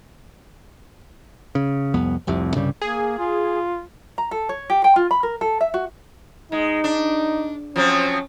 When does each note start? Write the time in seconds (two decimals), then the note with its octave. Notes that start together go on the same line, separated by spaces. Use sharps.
1.55 C#3
1.94 C2 F2 B3
2.27 F1 C2 F2 C3
2.54 C2 G2 C#3 G3
2.81 A#3 G#4
3.19 F4
4.18 A#5
4.31 A4
4.49 C#5
4.70 G4
4.84 G5
4.96 F4
5.11 B5
5.23 A#4
5.41 A4
5.61 E5
5.74 F#4
6.52 G#3 D#4
6.84 D4
7.76 F3 F#3 C4 C#4